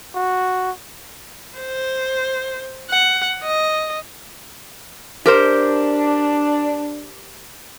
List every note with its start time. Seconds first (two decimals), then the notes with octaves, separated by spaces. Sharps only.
0.15 F#4
1.58 C5
2.91 F#5
3.43 D#5
5.26 D4 G4 A#4 C5